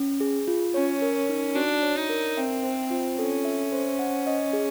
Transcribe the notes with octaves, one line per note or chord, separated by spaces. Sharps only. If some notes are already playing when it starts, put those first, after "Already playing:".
Already playing: C#4
G#4
F4
C#4 C#5
A#4
D#4
D4 F#4
C#5
D#4
A#4
C4 E5
C5
F4
C#4 A4
E5
C5
F#5
D#5
G#4